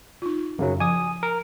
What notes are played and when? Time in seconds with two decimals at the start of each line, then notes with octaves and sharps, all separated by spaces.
0.22 D#4 F4
0.59 F#2 C#3 F#3
0.80 F3 G#5 D#6
1.23 A#4